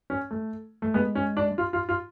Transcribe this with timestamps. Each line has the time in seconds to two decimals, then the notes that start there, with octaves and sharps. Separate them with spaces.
0.10 C#4
0.31 A3
0.82 A3
0.94 G#3 B3
1.15 C#4
1.37 D4
1.58 F4
1.73 F4
1.89 F4